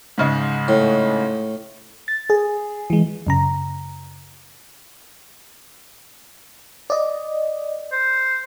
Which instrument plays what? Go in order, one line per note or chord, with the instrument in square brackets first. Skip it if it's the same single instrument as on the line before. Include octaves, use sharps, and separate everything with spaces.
[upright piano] G#2 C#3 G#3
[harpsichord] A2
[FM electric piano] A6
G#4
E3 G#3
[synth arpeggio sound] F#2 C#3 A#5
[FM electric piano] D5 D#5
[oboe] C5